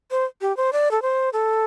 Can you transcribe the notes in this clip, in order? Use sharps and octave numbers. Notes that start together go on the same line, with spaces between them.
C5
G4
C5
D5
A4
C5
A4